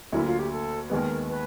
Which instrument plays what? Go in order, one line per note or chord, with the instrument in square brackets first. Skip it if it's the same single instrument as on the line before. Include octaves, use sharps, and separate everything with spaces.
[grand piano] D2 D3 F#3 A#3 [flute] E4
[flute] F4
G4
A4
[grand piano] D#2 D#3 G#3 B3 [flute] A#4
[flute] B4